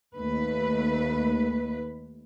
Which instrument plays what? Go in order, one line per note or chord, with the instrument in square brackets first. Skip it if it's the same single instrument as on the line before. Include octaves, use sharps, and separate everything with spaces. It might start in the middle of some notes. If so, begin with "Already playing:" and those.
[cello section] D#2 A3 B4